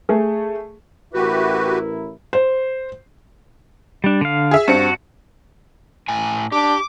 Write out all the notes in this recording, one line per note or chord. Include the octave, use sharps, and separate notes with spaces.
A3 G#4
A1 E4 F#4 G4 A#4 B4
C5
G3 D4
D3 F5
G#4 E5
G2 C4 F#4 C#7
A2 G#5
D4 G4 D6